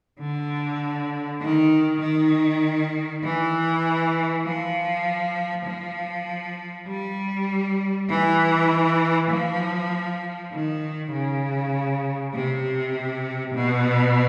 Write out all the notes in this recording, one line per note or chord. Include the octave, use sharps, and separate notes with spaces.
D3
D#3
D#3
E3
F3
F3
G3
E3
F3
D#3
C#3
C3
B2